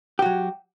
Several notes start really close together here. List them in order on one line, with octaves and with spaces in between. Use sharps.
G4 F#4 F#3